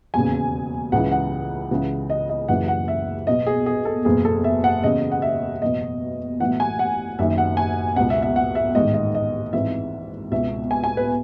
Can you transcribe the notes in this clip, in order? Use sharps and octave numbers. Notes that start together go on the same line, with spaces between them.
E1 D#2 C#3 G#5
C#2 C#3 E3 F#5
F#5
C#2 C#3 E3
D#5
D#5
F#1 F#2 C#3 E3 F#5
F#5
E5
B1 B2 D#5
G#4
G#4
A4
F#1 E2 B2 G#4
A4
E5
F#5
E1 E2 C#3 D#5
F#5
E5
F#1 E2 B2 D#5
B1 A2 E3 F#5
G#5
F#5
F#1 F#2 D#3 E5
F#5
G#5
C#2 B2 F#5
E5
E5
F#5
E5
A1 G#2 D#3 D#5
D#5
D#5
G#1 G#2 E3 E5
C#2 B2 E5
G#5
G#5
B4